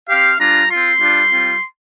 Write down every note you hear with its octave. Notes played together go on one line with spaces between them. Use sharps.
C4 G4 F5
G3 D4 F4 A#5
C4 F4 C6
G3 D4 F4
G3 C4 F4